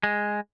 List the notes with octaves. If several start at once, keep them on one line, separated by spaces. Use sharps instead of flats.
G#3